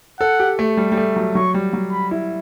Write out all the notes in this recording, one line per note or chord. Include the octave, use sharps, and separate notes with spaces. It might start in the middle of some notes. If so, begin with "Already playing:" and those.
A4 F#5
G4
A3
G3
G3
A3
F#3
F#3 C#6
G3
F#3
B5
E4